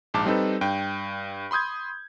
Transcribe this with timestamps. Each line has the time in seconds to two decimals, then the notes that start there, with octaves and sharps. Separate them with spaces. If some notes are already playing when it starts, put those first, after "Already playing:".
0.14 A#1 G#2 A5 D6
0.26 G3 C4 D#4 A4 B4
0.61 G2 G5
1.51 B5 C6 D#6 G6 G#6